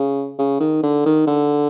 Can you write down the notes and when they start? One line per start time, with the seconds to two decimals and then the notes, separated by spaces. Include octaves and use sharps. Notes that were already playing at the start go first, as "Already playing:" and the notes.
Already playing: C#3
0.38 C#3
0.60 D#3
0.83 D3
1.05 D#3
1.27 D3